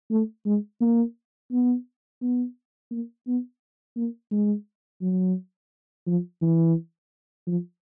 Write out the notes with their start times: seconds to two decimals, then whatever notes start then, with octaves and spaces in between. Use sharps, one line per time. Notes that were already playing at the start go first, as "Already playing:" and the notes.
0.11 A3
0.46 G#3
0.81 A#3
1.52 B3
2.22 B3
2.91 A#3
3.27 B3
3.97 A#3
4.32 G#3
5.02 F#3
6.07 F3
6.42 E3
7.47 F3